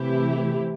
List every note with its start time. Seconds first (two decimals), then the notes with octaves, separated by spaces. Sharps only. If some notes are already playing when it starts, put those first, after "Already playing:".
Already playing: C3 E3 A3 E4 G4